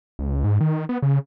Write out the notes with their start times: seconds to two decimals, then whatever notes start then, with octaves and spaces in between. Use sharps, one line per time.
0.19 C#2
0.44 G#2
0.61 D#3
0.89 B3
1.02 C#3